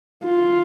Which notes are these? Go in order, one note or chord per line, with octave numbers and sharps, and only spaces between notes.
F4